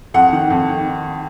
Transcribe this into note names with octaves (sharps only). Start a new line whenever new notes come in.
F2 F#5
D#3
F2
D#3